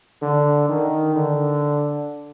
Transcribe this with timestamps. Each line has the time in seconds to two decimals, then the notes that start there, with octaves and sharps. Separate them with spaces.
0.22 D3
0.69 D#3
1.16 D3